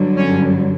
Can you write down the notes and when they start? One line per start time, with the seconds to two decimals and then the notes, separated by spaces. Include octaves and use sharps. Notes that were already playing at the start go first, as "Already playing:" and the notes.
Already playing: G2 D3 F#3
0.17 C#4